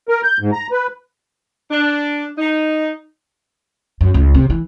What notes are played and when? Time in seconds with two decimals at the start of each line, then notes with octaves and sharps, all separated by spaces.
0.09 A#4
0.23 G6
0.40 G#2
0.53 A#5
0.72 B4
1.71 D4
2.38 D#4
4.01 F#2
4.14 C#2
4.34 C3
4.50 E3